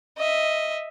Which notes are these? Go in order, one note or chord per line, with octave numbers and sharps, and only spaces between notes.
D#5 E5